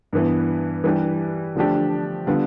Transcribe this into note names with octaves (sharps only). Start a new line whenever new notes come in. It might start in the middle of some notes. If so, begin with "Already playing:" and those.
G2 E3 B3
E3 G3 D4 G4
D3 F3 A3 D4 G4
D3 G3 B3 F4